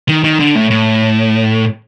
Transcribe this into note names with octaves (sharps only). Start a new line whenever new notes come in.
D#3
D#3
D3
A2
A2